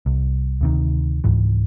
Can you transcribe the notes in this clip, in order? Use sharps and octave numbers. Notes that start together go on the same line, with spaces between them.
C2
D2 C3 D#3
C#2 G#2 E3